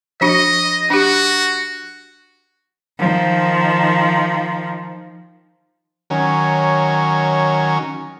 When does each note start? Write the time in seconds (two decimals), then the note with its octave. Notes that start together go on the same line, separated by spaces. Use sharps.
0.21 F3 D4 F#4 D#5
0.90 D4 F#4 G4
2.98 D#3 F3
6.10 D#3 F#3 C#4